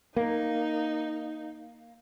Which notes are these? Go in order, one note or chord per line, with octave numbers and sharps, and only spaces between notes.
A#3 D#4